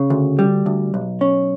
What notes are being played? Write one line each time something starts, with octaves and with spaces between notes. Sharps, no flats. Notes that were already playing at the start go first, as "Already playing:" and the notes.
Already playing: C#3
D2
G3
D2
B1
C#4